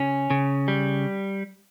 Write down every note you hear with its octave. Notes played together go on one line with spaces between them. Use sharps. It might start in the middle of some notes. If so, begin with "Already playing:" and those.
Already playing: C#3 C#4
C#3
G3